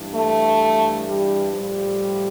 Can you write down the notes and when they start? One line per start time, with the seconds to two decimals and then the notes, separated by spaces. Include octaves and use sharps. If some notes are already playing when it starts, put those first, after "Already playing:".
Already playing: G2 E3
0.13 A3
1.06 G3
1.52 A2 F3 G3